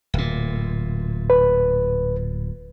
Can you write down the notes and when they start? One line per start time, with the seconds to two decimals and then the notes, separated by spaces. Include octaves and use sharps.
0.14 D1 A#2
1.30 B4